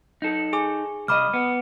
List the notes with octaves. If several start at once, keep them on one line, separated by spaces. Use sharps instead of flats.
D#4 A4
G#4 G#5 D6
C2 D#5 B5 D6 F6
B3